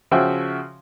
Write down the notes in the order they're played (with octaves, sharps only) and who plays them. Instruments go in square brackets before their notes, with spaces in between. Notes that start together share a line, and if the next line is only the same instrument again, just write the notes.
[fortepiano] C#3 F3 F#4 E5 G5 G#5